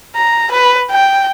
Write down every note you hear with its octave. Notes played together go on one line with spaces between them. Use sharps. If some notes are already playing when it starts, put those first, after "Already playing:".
A#5
B4
G5